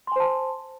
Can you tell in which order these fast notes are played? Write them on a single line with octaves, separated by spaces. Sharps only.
C6 G#5 C5 A5